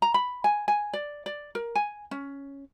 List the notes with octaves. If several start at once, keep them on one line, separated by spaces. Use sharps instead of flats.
A#5
B5
G#5
G#5
D5
D5
A#4
G#5
C#4